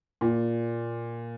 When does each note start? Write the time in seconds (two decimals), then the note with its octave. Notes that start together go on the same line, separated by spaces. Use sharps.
0.21 A#2